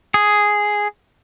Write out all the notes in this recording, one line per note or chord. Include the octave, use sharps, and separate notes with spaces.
G#4